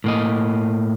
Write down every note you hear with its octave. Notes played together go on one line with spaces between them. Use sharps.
A2 A#3 D#5